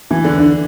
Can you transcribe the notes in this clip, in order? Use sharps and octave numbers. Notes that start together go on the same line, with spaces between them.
E3
D3
D3